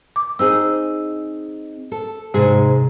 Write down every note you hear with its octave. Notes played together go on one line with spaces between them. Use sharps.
D6
C4 D#4 G#4 E6
A4
E2 G#2 C3 G#4